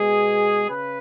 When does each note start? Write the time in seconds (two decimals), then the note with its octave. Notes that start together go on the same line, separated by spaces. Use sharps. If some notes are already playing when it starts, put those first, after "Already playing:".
Already playing: B2 G#3 B3 G#4
0.69 C#3 B4